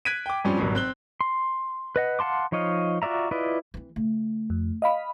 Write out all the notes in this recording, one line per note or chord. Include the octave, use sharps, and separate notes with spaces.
F#6 G#6 B6 D7 D#7
G5 D6
G2 F3 G3 C4 C#4
G#1 G2 B2 F#3
C4 F#6 G7
C6
B4 D#5 F#5
F5 F#5 A5 C6 D6
F3 D#4 C#5 D#5 F5
F4 F#4 D5 E5 A#5
E4 F4 B4 D5 D#5
E3 C4
C#3 A3
F2
D#5 F5 B5